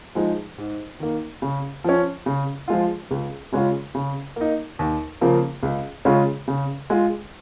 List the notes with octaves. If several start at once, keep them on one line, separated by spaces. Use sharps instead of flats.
F3 G#3 D#4
G#2
D#3 A#3
C#3
F3 C#4
C#3
F3 G#3 F4
C#2
C#3 G#3 C#4 F4
C#3
A#3 D#4
D#2
C#3 F3 A#3
C#2
C#3 G#3 C#4 F4
C#3
G#3 F4